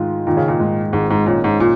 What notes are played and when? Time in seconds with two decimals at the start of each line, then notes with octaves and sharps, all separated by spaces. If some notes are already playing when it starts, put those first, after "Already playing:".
Already playing: G#2 D#3 F4
0.27 A#2 D#3
0.37 C#3
0.48 A#2
0.60 G#2
0.93 G#1 G#2
1.10 G#2
1.26 A#2 C#4
1.44 G#2
1.60 A#2